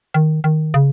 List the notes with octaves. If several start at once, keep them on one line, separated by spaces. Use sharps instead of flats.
D#3
D#3
C#3